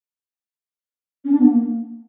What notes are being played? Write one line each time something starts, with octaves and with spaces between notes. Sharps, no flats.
C#4
D4
B3
A#3